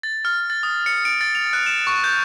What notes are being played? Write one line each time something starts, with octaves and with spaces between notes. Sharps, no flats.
A6
F6
A6
D#6
C#7
D7
A6
F7
F#6
E7
C#6
G6